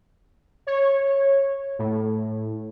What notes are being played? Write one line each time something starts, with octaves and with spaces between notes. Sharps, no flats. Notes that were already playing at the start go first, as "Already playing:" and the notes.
C#5
A2